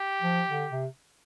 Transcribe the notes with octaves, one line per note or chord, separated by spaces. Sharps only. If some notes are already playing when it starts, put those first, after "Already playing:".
Already playing: G4
F3
D3
C3